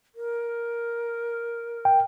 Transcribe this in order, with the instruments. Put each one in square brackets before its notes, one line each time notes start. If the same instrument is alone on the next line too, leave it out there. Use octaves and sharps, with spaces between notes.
[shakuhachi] A#4
[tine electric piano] G5